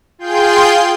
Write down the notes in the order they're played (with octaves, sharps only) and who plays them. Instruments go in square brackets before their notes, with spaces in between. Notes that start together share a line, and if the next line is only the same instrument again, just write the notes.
[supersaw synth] F4 G#4 G5 C6 G6